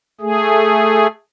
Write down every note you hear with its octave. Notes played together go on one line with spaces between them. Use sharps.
A3 G#4